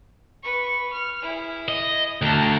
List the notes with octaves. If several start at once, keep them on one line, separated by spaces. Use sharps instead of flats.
B4 C#6
F6
E4 G#4
D#5
D2 A5 A#5